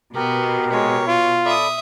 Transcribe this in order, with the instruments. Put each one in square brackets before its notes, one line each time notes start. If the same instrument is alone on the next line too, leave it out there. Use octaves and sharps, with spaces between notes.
[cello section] B2 [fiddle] B3 [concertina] G4 A#4
[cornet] G#3 [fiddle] C#5
[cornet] F4
[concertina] A4 D5 B5 [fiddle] E5 D#6